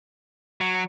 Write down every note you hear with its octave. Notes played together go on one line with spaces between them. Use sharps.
F#3